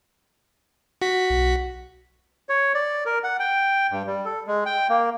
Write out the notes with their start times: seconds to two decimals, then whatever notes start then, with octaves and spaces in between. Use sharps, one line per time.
1.02 F#4 B6
1.30 B1
2.49 C#5
2.74 D5
3.06 A#4
3.24 F#5
3.40 G5
3.91 G2
4.07 G3
4.25 A4
4.47 G#3
4.66 G5
4.90 A#3